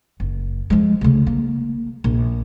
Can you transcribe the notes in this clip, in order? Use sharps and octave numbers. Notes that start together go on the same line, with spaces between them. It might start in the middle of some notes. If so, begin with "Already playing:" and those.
F#1
F3 G#3
D2 C#3
A#3
A#1